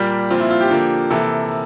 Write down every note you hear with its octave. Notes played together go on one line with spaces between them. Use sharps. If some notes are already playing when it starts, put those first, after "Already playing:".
Already playing: A#2 G3 A#3 G4
A#2 F3 C4 F4
E4
F4
G4
D3 F3 A#3
C3 E3 A#3 A4